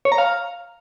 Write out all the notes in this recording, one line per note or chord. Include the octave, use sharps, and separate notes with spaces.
C#5
A#5
F5